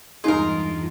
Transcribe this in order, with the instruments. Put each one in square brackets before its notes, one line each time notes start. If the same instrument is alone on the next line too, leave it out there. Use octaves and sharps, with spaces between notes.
[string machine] E2 G2 G#3 [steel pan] D#4 G#4 [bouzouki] F4 A#4